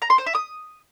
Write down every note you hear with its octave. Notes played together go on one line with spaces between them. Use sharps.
A#5
C6
C5
E5
D#6